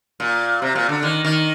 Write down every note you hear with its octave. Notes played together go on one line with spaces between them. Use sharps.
A#2
C3
A#2
D3
D#3
D#3